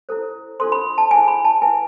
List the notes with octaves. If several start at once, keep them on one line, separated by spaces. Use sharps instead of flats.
E4 A4 C5
D4 F4 A4 C5 C6
B5
A5
E4 G#4 C5 G#5
B5
A5
E4 B4 G#5